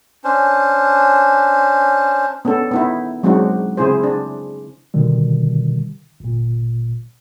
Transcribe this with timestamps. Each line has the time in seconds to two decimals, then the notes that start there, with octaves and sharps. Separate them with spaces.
0.24 C#4 D4 C5
2.45 B3 C#4 D4 A4
2.71 B3 D#4 E4
3.23 F#3 G#3 C4 D4 D#4 F#4
3.77 C#3 C4 E4 G#4 C5
4.03 D4
4.94 B2 D3 D#3 G3
6.20 G1 A#2